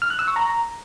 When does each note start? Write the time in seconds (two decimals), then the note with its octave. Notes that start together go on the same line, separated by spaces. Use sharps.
0.02 F6
0.10 F#6
0.19 E6
0.27 C#6
0.36 A#5